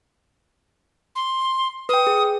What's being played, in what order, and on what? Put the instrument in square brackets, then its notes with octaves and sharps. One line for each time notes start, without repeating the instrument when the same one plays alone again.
[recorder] C6
[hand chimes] B4 G5 [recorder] D#6
[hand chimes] G#4